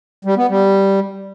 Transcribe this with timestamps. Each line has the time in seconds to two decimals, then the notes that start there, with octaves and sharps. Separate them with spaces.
0.25 G3
0.37 B3
0.49 G3